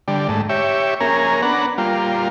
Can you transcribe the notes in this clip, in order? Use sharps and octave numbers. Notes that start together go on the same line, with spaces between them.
D3 G3
G#2 A3
G4 C#5 E5
A#3 C#4 G#4 A#4
B3 D4 F#5 A#5
G3 A#3 F4